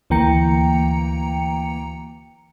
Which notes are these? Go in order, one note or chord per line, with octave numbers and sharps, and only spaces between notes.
D2 E3 A#3 G5 A#5 C#7